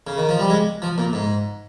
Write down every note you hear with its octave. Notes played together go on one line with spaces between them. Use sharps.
C#3
D#3
F3
G3
G#3
F3
A#2
G#2